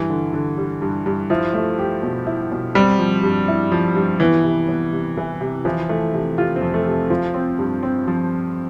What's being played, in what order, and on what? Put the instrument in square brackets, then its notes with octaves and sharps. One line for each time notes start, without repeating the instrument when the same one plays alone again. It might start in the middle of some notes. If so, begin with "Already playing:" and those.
Already playing: [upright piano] G2 [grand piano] E3
[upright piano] D3
D3
G3
G2
G2
[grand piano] F3 [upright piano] E4
[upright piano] A3
G4
B2
E4
B2
[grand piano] G3 [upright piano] C4
[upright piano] F3
G2
E4
F3
G2
[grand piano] E3 [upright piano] B3
[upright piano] C3
B3
C3
E3
C3
[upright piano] E3 [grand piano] F3
[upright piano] E3 [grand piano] A3
[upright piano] C3
[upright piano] C3 [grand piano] F4
[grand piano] C4
[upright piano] F2
[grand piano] A3
[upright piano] C3
[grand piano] F3 [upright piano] F4
[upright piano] C4
G2
C4
F3